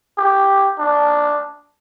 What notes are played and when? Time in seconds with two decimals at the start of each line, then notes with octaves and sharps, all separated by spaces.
0.18 G4
0.79 D4